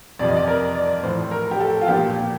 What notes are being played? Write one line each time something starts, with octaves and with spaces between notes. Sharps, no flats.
F2 C3 F3 D5
D#5
D5
A#4
D5
A2 F3 C5
A#4
G4
A4
F4
A#2 F3 G4